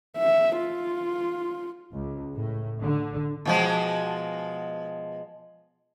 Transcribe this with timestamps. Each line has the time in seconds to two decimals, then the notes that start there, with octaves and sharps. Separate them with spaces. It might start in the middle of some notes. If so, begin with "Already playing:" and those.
0.17 E5
0.58 F4
1.92 C#2
2.36 A2
2.81 D3
3.45 B2 F3 G#3